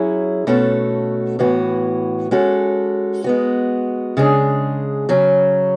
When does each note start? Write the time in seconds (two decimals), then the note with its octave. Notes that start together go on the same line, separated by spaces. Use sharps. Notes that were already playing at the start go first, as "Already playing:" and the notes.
Already playing: F#3 C#4 E4 G#4
0.47 B2 A3 C#4 F#4 A4
1.39 A2 E3 B3 F#4
2.31 G#3 C#4 F#4 A4
3.24 G#3 B3 F#4
4.17 C#3 G#3 D4 G#4
5.09 C#3 F#3 C#4